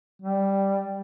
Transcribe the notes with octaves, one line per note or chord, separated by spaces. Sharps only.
G3